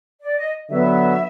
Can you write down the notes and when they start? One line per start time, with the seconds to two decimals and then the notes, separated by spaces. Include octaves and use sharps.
0.22 D5
0.37 D#5
0.69 D3 F#3 B3 E5